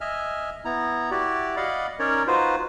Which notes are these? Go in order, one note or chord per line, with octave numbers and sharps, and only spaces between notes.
D#5 E5 G#5 F6
B3 E4 A#5
E4 F#4 G4 D5
D5 D#5 F5 F#5 B5
C#4 D#4 A#4 C#5 D5
D#4 F4 F#4 B4 C5